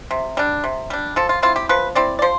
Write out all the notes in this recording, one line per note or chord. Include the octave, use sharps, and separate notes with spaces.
C3
G3 D4
C3
G3 D4
F3 A4
F4
C4 E4 F4
G4
F3 B4
C4 E4 D5
D5
F3 C5